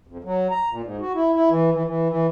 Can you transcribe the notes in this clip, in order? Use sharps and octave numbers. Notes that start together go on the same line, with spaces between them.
F2
F#3
A#5
A#2
G#2
F#4
E4
E4
E3
E3
E3
E3